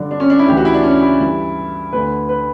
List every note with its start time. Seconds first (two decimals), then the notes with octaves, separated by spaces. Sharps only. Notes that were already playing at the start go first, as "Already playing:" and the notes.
Already playing: G2 D3 D4
0.11 D4
0.20 C#4
0.30 D4
0.39 E4
0.47 D2 C#3 E3 G4
0.57 F#4
0.65 E4
0.74 D4
0.83 C#4
1.02 E4
1.20 G2 E3
1.93 D2 D3 B4
2.29 B4